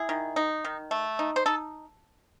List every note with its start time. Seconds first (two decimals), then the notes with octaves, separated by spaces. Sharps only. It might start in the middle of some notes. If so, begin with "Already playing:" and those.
Already playing: E4 G#4
0.09 D#3
0.36 D#4
0.65 D#3
0.91 A3
1.19 D#4
1.36 C5
1.46 D#4 A4